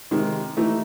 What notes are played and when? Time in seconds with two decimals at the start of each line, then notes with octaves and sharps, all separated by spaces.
0.11 C3 D#3 G#3
0.57 E3 A3 D#4